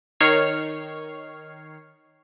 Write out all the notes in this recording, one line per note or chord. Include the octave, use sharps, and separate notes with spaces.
D#3 C#5 F6 C7